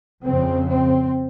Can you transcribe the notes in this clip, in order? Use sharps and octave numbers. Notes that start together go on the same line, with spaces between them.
F2 C#3 C4
C4